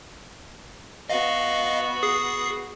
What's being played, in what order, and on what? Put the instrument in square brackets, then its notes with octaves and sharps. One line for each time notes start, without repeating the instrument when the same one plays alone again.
[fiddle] B3 F#4 [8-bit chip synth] D#5 F5
[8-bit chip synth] G#4 D#6 C7